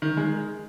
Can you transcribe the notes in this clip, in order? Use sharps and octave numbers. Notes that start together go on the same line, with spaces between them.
D#3
G#3